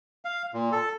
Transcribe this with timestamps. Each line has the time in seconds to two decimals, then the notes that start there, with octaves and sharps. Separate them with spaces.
0.25 F5
0.54 A#2
0.72 A4